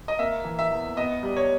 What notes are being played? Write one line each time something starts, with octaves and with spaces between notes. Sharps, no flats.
D#5
A#3 E5
E3
E5
E2
B3 D#5
G3
C#5